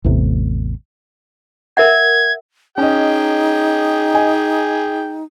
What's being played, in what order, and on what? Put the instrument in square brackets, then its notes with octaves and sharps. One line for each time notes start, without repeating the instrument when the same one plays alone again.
[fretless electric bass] A1 E2 A2 C3
[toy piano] A#4 E5 F#5 [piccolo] G#6
[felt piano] C#4 D#5 [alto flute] D#4 [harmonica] G#4 G5
[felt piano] D#5 G#5